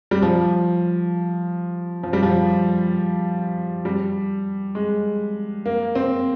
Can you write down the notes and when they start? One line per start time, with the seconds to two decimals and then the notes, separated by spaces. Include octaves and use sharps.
0.11 G3
0.22 F3
2.03 F3
2.13 G3
2.23 F3
3.85 G3
4.75 G#3
5.66 A#3
5.95 C4